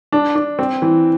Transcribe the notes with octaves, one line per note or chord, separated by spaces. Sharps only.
D4
D4
C4
E3